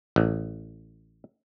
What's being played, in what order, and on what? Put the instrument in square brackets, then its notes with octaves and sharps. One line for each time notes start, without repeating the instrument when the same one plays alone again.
[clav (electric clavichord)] A1